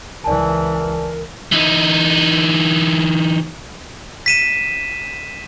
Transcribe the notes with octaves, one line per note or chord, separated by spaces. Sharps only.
C#2 E3 A#4 D5 G#5 A5
E3 D#4
B6 D#7 E7